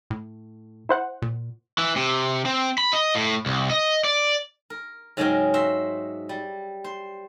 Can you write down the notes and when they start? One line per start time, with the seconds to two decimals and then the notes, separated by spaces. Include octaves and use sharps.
0.11 A2
0.89 E4 C5 F#5
1.22 A#2
1.78 E3
1.96 C3
2.45 C4
2.78 B5
2.93 D#5
3.15 A2
3.46 C2
3.71 D#5
4.04 D5
4.70 A#4
5.17 G#2 C#3 F#3 G#3 A#4 G5
5.54 F#4 C5 E5
6.29 G3
6.84 C5